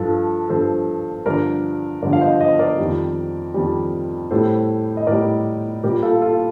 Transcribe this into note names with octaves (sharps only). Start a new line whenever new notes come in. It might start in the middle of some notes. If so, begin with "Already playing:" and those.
Already playing: G2 F3 F4 A4
G2 F3 A4 C5
G2 D3 F3 A#4 D5
G2 D3 F3 A#4 D5
F5
C5 D#5
C5 D#5
A#4 D5
F2 D#3 G3
F2 D#3 G3
A2 G3 A4 C5
D#5
A2 G3 A#4 D5
A#2 G3 G4 A#4
F4 A4
F4 A4